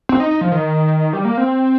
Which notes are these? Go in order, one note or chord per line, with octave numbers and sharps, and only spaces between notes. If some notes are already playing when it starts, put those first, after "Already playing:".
C4
D#4
D#4
F3
D#3
G3
A#3
C4